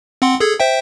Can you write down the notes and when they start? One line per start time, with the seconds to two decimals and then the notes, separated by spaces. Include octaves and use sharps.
0.22 C4 F#5 C6
0.40 G#4 A4 G#6
0.60 C5 E5 G5